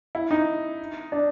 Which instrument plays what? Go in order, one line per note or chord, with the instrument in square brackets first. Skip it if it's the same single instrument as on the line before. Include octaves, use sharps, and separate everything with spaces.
[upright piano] E4
D#4
D4